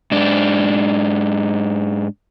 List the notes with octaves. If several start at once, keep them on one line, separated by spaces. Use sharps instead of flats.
G#2 D4